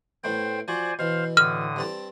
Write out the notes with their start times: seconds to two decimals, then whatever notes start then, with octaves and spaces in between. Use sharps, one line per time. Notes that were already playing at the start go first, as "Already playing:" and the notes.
0.24 A2 A3 B3 C5 G5
0.68 F3 F#4 C5 D5 G#5
0.99 B2 E3 C5 F5
1.37 A2 D3 D#6 F6
1.76 G2 C4 A5